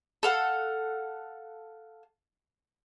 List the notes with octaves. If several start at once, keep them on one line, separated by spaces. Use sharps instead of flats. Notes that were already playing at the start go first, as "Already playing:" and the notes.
A4 F5 F#5